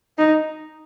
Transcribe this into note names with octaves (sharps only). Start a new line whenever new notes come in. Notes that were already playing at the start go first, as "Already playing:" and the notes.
D#4